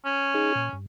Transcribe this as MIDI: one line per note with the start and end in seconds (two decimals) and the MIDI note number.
0.05 0.73 61
0.34 0.53 63
0.34 0.53 68
0.55 0.69 46
0.73 0.86 43